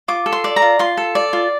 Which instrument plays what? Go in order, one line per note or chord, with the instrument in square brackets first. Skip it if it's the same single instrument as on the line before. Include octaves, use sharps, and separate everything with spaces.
[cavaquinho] F4 D6
A4
C6
D5
A#5
F4
F4 C6
A4
D5
F4